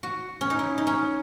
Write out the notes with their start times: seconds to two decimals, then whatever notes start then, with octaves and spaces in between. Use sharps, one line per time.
0.03 F#4
0.41 C#4
0.50 D#4
0.59 E4
0.78 D#4
0.87 C#4